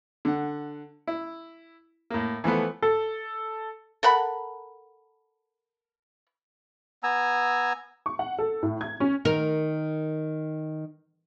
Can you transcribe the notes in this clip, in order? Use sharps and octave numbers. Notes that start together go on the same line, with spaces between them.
D3 F#5
E4
A2 A#3
E3 F3 A3 B3
A4
A4 A#4 F#5 B5
B3 G#5 A#5 E6
C#6
F#5
A4
A2
G#6
C#4
D#3 A#4